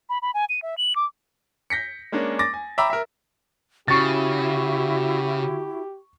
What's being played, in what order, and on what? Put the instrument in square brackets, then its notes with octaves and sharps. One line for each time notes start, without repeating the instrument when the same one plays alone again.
[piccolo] B5
B5
G#5
D#7
E5
F#7
D6
[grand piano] G6 A#6 B6 C#7
G#3 A#3 C#4 D4
D6 A6 A#6
G#5
E5 G5 A#5 B5 D6 E6
A#4 E5
[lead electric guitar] C#3 [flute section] E4 F#4 [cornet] G4 [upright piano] C#6 A6